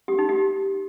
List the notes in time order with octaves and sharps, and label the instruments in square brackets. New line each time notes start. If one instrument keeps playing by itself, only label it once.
[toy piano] G4
D#4
G4